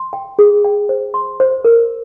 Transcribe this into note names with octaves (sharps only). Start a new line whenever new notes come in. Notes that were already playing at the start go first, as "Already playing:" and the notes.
Already playing: C6
G5
G#4
G5
C5
C6
C5
A#4